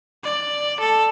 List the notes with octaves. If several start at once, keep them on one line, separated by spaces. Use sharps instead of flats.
D5
A4